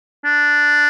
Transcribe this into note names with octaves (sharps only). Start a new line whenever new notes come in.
D4